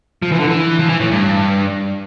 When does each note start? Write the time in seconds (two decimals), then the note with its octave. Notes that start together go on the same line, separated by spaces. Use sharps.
0.22 F3
0.32 E3
0.39 D3
0.47 E3
0.79 F3
0.89 E3
1.00 A2
1.11 G2